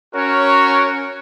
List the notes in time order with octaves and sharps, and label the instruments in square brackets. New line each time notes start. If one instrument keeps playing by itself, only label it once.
[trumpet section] C#4 F#4 A#4 C#5